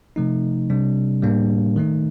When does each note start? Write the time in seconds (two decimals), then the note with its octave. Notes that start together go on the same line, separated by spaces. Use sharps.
0.16 C3 F3 A3 D#4
0.70 C3 G3 D4
1.23 A2 G3 A#3 D4
1.76 D#3 A3 D#4